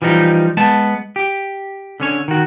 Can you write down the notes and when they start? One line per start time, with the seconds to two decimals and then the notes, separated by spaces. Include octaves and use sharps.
0.02 E3 F3 G3 D#4
0.57 G#3 B3 A5
1.16 G4
2.00 D3 C#4 C#5
2.28 D#3 F#4